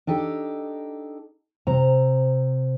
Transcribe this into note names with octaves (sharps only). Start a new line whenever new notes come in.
D4 D#4 G4 A4 D#5
C3 C5 A#5